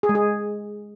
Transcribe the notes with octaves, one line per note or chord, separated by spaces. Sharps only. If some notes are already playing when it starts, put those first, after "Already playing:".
G#4
G#3
G#4